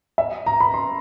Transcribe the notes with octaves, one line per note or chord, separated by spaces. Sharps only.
E5
A#5
B5
C6